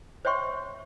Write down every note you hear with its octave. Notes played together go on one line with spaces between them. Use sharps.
C5 C#5 E5 G5 C6 C#6